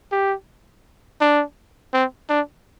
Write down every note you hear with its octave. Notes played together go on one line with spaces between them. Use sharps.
G4
D4
C4
D4